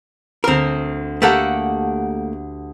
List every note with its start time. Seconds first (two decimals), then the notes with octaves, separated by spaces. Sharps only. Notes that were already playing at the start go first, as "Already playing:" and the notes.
0.44 D2 C4 A#4 F6
1.22 A3 A#3 G4 A4 F#5